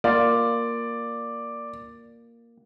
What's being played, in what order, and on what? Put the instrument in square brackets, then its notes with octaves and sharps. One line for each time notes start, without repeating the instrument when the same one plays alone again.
[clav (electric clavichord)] A#3 F4 [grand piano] D5